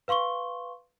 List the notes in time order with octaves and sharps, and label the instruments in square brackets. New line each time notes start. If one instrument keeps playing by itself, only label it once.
[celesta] B4 F5 C6 C#6 G7